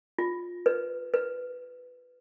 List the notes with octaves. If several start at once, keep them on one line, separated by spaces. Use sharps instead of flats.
F4
B4
B4